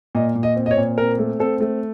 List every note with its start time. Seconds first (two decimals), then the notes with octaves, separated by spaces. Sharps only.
0.15 A#2 D#5
0.35 A#2
0.43 D#5
0.56 C4
0.66 D#5
0.71 C#5
0.77 A#2
0.98 C4 A#4
1.18 A3
1.39 C4 A4
1.60 A3